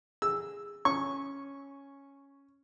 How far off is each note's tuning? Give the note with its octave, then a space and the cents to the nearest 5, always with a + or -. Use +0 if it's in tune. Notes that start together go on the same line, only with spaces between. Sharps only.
G#4 -20 E6 +0
C#4 +0 C#6 -10